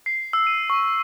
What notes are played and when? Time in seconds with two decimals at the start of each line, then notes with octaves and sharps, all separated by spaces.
0.06 C7
0.33 E6
0.47 D#7
0.70 C#6